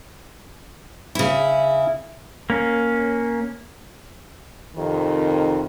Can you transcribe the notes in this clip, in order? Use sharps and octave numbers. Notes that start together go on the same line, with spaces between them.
C#3 E4
A#3 C#4
F2 C3 D#3